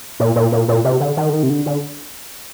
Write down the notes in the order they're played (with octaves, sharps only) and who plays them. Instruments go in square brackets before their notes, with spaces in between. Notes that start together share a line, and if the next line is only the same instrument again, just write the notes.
[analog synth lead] A#2
A#2
A#2
A#2
C3
D3
D#3
D3
D#3
C3
D3
D3